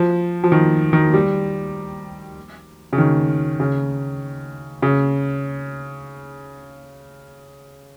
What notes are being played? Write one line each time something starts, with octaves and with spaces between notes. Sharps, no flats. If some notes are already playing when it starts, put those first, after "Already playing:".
Already playing: F3
F3
D#3
D#3
G3
C#3
D#3
C#3
C#3